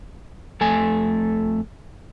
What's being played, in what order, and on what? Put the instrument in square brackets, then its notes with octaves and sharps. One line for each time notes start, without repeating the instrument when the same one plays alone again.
[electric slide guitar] F2 A3 G#5